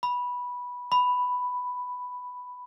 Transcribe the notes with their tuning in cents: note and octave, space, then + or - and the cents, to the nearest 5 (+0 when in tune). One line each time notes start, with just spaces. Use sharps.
B5 -10
B5 +5